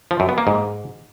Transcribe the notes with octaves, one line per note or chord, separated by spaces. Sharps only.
F3
F#2
B3
A#3
G#2